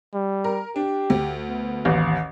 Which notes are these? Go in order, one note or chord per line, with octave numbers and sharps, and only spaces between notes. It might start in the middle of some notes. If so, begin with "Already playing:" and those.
G3
A#4
D4 G4
D2
B3
A1 D#2